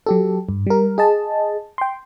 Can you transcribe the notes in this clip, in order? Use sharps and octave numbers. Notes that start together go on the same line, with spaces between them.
F#3 G4 A4
G2
G3 A#4
G#4 D#5 A5
G5 C6